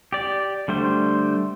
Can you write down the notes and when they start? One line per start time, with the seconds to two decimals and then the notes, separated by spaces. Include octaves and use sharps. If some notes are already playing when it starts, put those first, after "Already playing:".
0.13 G4 D5
0.68 D3 G3 A3 C5